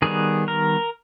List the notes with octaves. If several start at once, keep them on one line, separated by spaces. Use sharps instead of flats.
D#3 G3 B3 G#4
A#4